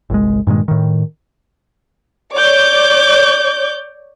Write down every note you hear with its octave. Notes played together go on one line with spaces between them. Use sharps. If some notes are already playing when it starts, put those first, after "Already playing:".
G1 C2 G#3
G2 A#2 D#3 G#3
A2 D#3
C#5 D5 D6 G6